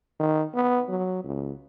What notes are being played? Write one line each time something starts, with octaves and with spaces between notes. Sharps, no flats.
D#3
B3
F#3
C#2